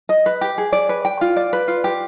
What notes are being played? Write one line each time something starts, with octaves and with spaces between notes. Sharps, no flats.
D#5
B4
G4
G#4
D5
B4
G5
F4
D5
B4
F4
G4